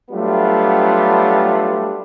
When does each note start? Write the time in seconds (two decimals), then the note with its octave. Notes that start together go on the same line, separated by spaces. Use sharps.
0.11 F#3 G3 A3 B3 D4 F4